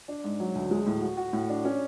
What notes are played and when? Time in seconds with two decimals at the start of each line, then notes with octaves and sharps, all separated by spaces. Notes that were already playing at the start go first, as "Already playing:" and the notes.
0.08 D4
0.24 G#2
0.40 F#3
0.55 D2
0.71 G#3
0.86 A2
1.02 F#4
1.17 F#4
1.33 A2
1.49 D4
1.65 C#4